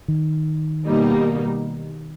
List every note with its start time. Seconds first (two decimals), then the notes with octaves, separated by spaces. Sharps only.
0.08 D#3
0.86 B2 G3 A#3 D#4